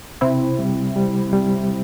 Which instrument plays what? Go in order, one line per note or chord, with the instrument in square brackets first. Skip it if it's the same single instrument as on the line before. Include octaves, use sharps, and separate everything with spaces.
[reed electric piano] C3 [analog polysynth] C4 E4
[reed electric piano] G3
G3
G3